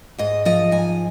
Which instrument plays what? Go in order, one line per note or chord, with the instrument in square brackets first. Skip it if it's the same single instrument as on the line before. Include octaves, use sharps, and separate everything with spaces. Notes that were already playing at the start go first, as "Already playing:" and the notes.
[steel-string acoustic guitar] G#2 D#5
F3 D#5
G#2 G#5